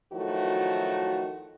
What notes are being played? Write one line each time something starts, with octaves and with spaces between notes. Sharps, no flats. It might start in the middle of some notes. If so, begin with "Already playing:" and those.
D#3 F3 F#3 A3 E4 F#4